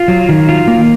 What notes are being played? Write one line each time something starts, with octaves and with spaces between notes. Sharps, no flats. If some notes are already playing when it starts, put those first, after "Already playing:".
Already playing: F4
F#3
D#3
F4
A#3